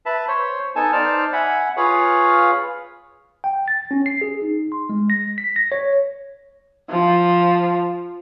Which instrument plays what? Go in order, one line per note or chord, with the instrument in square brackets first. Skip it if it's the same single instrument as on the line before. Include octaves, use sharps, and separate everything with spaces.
[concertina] B4 E5 A5
C5 C#5
B3 D#4 A4 G#5 A5
D#4 C5 D5 A5 F6
E5 F#5 G#5 B5
F4 G#4 B4 C#5 F5
[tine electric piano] G5
A6
C#4
C7
G#4
D#4
C6
G#3
A#6
B6
A#6
C#5
[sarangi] F3